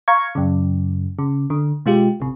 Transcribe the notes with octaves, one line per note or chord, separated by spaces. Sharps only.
F5 A#5 C#6 G#6
F#2 C#3
C#3
D3
B2 G#3 F4 G4
G#1 C3